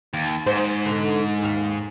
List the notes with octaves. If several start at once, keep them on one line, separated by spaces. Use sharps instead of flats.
D#2
G#2 C5
B2 D3
D#2 F5